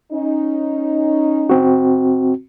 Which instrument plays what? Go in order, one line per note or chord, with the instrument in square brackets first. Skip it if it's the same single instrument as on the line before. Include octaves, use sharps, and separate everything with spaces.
[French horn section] C#4 D#4
[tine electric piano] C4 F#4